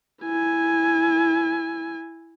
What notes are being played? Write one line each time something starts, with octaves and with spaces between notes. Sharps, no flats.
E4 G#5